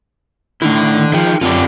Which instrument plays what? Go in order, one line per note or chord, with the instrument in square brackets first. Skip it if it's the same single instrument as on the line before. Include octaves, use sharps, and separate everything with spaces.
[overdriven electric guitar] D3 [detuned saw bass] D#3 [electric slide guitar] A3 E4
[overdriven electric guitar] F3 [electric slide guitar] D#4 G#4 G5
[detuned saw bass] F#2 [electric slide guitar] D3 C4 D4 [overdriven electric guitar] F4 G4